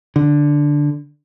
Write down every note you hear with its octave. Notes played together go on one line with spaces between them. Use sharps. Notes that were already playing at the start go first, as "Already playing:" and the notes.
D3